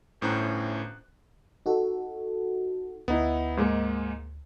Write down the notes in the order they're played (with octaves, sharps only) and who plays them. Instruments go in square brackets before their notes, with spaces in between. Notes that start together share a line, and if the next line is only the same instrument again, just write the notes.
[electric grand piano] G1 A2 C#4 C5 A#5 F#6
[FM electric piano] D#4 F#4 A4
[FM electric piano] D2 [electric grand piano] B3 D#4 E4
[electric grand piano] G#2 G#3 A#3